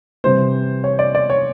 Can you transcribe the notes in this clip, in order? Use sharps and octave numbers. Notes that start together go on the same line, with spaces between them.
C3 E3 G3 C5
C#5
D5
D5
C#5